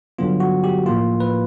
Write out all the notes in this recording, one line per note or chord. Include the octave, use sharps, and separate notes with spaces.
G2 D3 F#3 B3 F4
F#4
G4
A2 F3 A#3 F4
B4